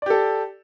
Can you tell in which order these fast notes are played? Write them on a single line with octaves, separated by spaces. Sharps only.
D5 G4 A4